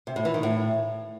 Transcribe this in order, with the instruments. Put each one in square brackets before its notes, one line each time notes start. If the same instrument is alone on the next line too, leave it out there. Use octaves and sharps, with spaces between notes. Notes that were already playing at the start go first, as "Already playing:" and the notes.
[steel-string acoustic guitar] C3
A2
E3
D#3
A2